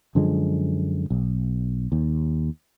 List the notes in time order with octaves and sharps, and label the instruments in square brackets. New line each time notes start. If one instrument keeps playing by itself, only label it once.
[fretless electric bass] F#2 D3 F3 G#3
B1
D#2